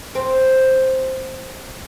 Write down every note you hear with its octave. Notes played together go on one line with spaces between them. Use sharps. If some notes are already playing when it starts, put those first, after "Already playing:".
C4